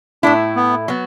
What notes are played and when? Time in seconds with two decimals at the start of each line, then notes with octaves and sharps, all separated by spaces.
0.23 A2 A3 D4 E4
0.56 B3
0.88 F#3 B3